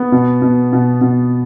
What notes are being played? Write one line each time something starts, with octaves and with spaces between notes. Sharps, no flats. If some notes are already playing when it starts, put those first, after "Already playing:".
Already playing: B3
B2
B2
B2
B2